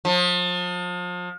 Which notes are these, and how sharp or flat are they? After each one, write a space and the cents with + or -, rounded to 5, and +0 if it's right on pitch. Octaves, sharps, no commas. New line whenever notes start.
F3 +35